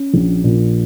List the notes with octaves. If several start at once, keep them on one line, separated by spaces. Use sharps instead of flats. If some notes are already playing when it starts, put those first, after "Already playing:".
Already playing: C#4
A#1
A#2